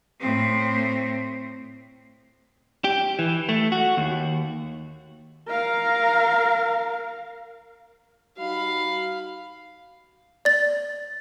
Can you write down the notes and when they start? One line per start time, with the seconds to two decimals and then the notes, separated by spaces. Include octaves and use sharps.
0.21 A2 C4
2.84 G4
3.19 E3
3.49 A3
3.72 F#4
3.97 D#2
5.48 A#4 F5
8.37 G3 D#4 F#4 F5 B5
10.45 D5 A6